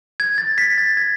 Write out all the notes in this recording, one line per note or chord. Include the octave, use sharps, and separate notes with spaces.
G#6
A6
B6
A6
G#6